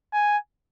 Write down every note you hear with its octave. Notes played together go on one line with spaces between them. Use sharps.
G#5